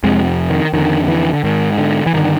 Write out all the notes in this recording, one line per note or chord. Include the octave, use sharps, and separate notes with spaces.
F2 C3 G#3
D#3
F2 D3 D#3
E3
D3
G#2 D#3
D3
E3
G2 D3 D#3